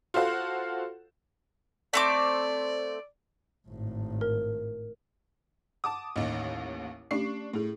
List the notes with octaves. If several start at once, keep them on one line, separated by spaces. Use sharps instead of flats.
F4 F#4 A4 C5 F5 F#5
A3 C4 D5 D6
G#1 A2
A#4
F#5 A5 D6 D#6
A1 D#2 D#5
A3 C#4 D4 G4 C#6 C7
A2 E4 G#4